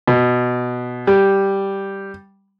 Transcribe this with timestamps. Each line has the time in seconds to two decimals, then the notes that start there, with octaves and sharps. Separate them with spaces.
0.08 B2
1.07 G3